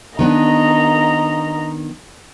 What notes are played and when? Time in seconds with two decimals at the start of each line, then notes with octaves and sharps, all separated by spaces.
0.19 D#3 B3 D4 D#5 A#5